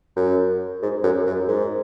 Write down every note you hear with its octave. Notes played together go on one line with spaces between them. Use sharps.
F#2
G#2
F#2
F#2
G#2